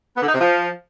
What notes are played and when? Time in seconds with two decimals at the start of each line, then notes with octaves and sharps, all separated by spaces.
0.16 B3
0.22 D3
0.28 D#4
0.34 C3
0.40 F3